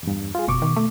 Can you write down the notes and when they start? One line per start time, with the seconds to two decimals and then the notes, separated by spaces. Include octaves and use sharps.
0.03 E2 G2
0.35 F4 G#4
0.48 F#1 B2 C#6 D6
0.62 D#3
0.76 A3